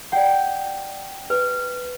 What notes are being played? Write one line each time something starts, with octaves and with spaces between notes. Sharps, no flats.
D5 F#5 G5
B4